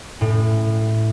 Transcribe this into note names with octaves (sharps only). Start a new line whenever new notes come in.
A2